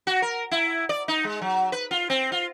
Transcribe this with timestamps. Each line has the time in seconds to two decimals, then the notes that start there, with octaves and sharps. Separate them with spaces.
0.07 F#4
0.22 A#4
0.51 E4
0.89 D5
1.08 D#4
1.24 G#3
1.42 F#3
1.72 B4
1.91 F4
2.10 C4
2.32 F4